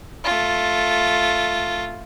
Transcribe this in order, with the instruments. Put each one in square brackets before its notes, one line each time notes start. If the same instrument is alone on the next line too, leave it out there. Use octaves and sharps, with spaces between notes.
[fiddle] A3 F4